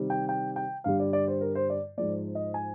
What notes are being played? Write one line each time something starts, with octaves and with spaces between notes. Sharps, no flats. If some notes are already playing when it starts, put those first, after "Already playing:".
Already playing: C3 D#3 G3
G5
G5
G5
G2 D3 G3 F5
D5
D5
C5
A#4
C5
D5
G#2 F3 G#3 D5
D#5
G#5